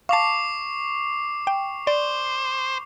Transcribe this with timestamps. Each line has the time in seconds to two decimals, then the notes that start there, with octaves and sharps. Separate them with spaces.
0.09 F5 A5 C#6 D6 C7
1.47 G5
1.87 C5 D5